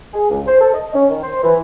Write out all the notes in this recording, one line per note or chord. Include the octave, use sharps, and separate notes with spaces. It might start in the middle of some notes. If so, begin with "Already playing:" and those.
G#4
C#2
C5
A4
D#5
C#4
D#3
C5
E3